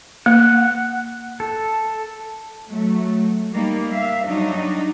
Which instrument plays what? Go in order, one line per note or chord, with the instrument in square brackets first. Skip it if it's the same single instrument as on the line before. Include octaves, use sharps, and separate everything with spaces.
[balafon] A#3 [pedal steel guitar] F#5
[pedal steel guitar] A4
[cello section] F#3 A3
G3 A#3 D#4
E5 F5
F#3 G3 D4 D#4